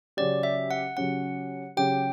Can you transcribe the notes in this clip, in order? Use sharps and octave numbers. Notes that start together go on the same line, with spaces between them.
C#3 F#3 C#4 G4 D5
E5
F#5
C#3 F#3 C#4 G4 F#5
C#3 F#3 C#4 G4 G5